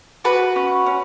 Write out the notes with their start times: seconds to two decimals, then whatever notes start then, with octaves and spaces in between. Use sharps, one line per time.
0.24 F#4 B4
0.56 C#4
0.86 C#4